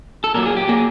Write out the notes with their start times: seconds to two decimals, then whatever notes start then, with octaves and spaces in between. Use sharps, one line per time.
0.24 A4
0.34 A#2 F#3 A#3 A#4
0.46 G#4
0.57 G4
0.68 A#2 F#3 A#3 G#4